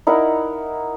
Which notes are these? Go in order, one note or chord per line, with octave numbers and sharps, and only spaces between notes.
D#4 E4 A#4 F#5